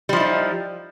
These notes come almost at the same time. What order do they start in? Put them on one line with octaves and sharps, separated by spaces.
G3 F3 E4 D#4